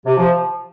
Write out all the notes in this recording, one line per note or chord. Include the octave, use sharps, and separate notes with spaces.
C3
F3